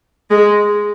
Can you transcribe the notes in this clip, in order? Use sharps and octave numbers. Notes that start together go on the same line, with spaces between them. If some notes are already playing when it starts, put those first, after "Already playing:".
G#3